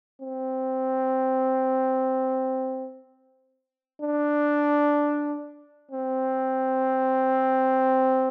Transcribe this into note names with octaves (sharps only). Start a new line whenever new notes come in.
C4
D4
C4